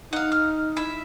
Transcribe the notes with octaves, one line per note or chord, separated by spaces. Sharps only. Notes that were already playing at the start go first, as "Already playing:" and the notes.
D#4 F5 F#5
F6
E4 E5